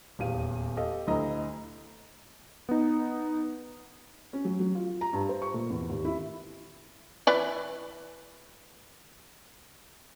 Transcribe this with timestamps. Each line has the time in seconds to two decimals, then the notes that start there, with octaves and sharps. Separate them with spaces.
0.19 D#1 E2 G4 F5 D#7
0.77 G4 A4 D#5 F5
1.07 D2 E4 D#5 A#5
2.69 B3 D#4
4.33 C#4
4.45 F#3
4.60 F#3
4.75 F4
5.01 A#5
5.13 G2
5.29 C5
5.42 C#6
5.54 A#2
5.70 E2
5.90 D#2
6.05 E4
7.27 E3 B4 D5